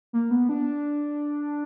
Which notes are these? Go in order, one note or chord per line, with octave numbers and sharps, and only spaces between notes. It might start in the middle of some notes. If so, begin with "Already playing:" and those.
A#3
B3
D4